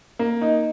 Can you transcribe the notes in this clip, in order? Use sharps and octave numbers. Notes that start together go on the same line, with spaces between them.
A#3
D#4